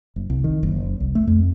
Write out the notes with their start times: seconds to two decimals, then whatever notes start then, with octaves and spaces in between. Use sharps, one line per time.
0.16 F#1
0.30 C2
0.44 D#3
0.63 F#1
1.00 C2
1.15 A3
1.27 F2